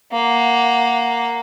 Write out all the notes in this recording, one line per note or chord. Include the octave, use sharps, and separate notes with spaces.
A#3 F#5